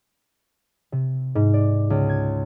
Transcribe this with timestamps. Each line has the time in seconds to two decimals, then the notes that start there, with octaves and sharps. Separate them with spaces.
0.92 C3
1.35 G#2
1.54 D5
1.90 C#2
2.09 G#6